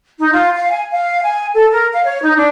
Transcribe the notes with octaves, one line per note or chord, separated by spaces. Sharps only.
D#4
F4
F5
G#5
F5
G#5
A4
A#4
F5
C#5
D#4
D4